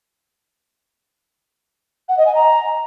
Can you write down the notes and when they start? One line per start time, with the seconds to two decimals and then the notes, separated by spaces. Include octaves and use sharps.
2.09 F#5
2.17 D#5
2.26 G#5
2.35 A#5